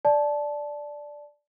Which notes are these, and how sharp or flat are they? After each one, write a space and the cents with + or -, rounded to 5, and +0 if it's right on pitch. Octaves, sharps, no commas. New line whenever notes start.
D5 +0 A5 -15